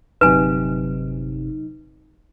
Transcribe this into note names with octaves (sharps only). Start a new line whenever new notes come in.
G1 C3 F#3 D#4 B4 G#5